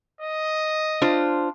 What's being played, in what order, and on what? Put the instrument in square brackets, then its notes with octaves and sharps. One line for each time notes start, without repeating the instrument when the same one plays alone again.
[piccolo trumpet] D#5
[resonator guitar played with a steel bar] D4 F4 C5